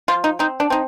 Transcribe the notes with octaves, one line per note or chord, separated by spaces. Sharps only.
F3 F4
D#4
C4 D#4
D4
C4 D#4